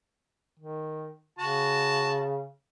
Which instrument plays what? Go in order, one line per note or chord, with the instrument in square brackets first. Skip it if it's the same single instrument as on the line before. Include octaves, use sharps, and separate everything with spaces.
[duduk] D#3
[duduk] C#3 [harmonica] F#4 A5